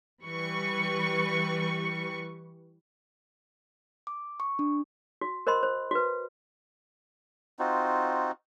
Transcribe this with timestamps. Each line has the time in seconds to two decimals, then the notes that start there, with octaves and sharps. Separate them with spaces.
0.24 E3 G3 B4 C#6
4.07 D6
4.40 C#6
4.59 D4
5.21 F#4
5.47 A#4 C5 D#5 B5 C6
5.63 C5
5.91 F#4 B4
7.59 C4 D#4 F4 F#4